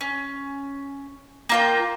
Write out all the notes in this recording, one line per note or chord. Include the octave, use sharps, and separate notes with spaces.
C#4
A#3 F4 G5